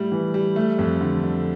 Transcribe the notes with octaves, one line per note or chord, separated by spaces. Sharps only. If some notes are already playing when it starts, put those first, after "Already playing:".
Already playing: A2 G3
E3
G3
A3
F2
D3
D3